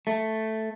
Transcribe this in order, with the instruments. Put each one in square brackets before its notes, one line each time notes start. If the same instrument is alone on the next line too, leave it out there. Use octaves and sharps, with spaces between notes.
[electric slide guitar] A3